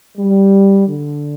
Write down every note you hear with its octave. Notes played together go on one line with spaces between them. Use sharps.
G3
D3